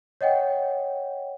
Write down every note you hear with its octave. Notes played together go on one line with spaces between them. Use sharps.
C#5 D#5 F#5 G5